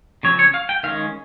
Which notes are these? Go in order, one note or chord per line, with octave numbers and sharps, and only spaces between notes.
C#3 F3 C4 C#5
C#5
F5
G5
D#3 G#3 C#4 F5